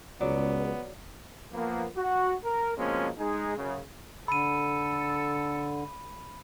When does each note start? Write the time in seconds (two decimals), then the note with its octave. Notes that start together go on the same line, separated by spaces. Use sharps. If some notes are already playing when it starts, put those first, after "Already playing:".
0.21 C#2 F#3 B3 D5
1.53 F3 A#3 B3
1.96 F#4
2.43 A#4
2.78 B2 F3 G#3 A#3 C4 C#4
3.18 G#3 D#4 G#4
3.58 F#2 C#3
4.28 D3 A4 B5 D#7